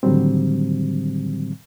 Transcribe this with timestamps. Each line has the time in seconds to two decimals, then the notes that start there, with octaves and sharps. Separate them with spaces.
0.03 A2 D3 D#3 F#3 G3 C4